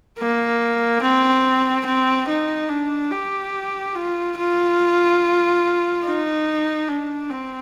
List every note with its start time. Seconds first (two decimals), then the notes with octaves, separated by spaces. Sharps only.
0.19 A#3
1.02 C4
1.85 C4
2.28 D#4
2.69 D4
3.11 G4
3.96 F4
4.37 F4
6.04 D#4
6.88 D4
7.30 C4